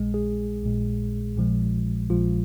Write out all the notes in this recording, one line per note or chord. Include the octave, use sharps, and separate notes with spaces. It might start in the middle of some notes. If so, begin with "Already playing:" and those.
Already playing: A#1 A#2 G#3
G#4
A#1 A#2 G#3
A#1 A#2 F3 G#3
A#1 A#2 F3 G#3 F4